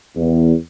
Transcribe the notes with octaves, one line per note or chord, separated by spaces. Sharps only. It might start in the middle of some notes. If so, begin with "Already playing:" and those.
E2